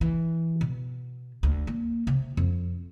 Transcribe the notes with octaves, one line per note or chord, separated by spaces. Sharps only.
E3
B2
D2
A#3
C3
F2